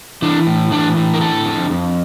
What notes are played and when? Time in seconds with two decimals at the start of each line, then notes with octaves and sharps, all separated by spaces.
0.22 E3 D4
0.47 A2
0.72 E3 D4
0.97 A2
1.14 A#4
1.21 D3 A4
1.46 F2
1.70 F2